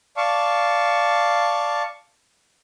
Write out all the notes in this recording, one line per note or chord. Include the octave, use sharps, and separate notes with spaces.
D5 F5 A5 C#6